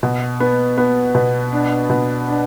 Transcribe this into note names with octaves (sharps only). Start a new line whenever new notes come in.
B2
B3
B3
B2
D4
B2
D4